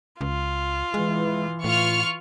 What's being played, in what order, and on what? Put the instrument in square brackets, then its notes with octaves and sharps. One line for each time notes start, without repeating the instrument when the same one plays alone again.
[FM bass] C#2 [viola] F4
[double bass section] E3 [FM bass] G#3
[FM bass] A2 [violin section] F4 C#6 F6